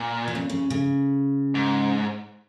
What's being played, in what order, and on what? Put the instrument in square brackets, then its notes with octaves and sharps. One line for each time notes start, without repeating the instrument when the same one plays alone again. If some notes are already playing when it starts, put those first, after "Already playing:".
Already playing: [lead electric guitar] A#2
[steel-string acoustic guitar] E3
C#3
C#3
C#3
[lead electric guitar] G#2